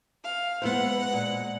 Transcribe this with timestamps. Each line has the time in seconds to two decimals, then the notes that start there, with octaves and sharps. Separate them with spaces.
0.24 F5
0.62 G#3 B3 E4 C5 F#5
1.13 A#2